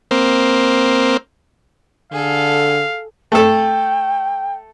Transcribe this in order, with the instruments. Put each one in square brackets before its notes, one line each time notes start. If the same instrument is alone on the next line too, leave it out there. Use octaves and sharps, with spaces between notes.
[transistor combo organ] A#3 C4
[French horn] D3 [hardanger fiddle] G#4 A4 [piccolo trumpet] F5
[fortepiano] A3 A4 [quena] G5